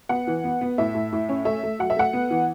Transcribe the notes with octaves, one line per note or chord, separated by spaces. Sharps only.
B3 F#5
E3
B3
B3
A2 E5
A2
A2
C#4
A3 E5
A3
F#3 F#5
E5
A3 F#5
B3
E3